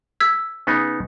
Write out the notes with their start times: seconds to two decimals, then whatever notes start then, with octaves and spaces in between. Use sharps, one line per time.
0.20 E6 G#6 B6
0.67 C#3 B3 D#4